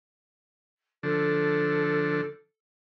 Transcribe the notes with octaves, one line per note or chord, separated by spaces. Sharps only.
D3 F3 D4 A4